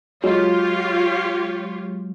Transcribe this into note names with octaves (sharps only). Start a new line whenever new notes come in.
F#3 G#3 F4 G4 C#5